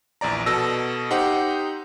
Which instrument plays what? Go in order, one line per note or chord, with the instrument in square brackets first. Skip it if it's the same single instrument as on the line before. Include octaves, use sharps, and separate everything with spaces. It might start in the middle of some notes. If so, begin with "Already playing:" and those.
[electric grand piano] A#1 E2 D5 A#5
B2 A4 E6 A#6
D#4 G4 C5 F#5